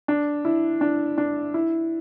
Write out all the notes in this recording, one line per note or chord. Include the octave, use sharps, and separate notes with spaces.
D4
E4
D4
D4
E4